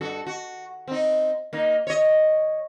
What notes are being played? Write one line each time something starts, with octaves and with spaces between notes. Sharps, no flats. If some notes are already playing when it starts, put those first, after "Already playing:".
G2 F#4 A4
F#4
C4 D#4
A#3 D#4
C#5 D#5